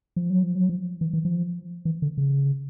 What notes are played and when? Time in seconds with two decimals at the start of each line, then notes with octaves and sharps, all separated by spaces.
0.16 F3
0.30 F#3
0.43 F3
0.55 F#3
0.69 F3
1.01 E3
1.13 E3
1.25 F3
1.85 E3
2.02 D3
2.18 C#3